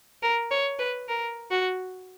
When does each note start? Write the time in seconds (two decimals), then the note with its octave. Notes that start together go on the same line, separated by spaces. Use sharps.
0.23 A#4
0.51 C#5
0.79 B4
1.08 A#4
1.50 F#4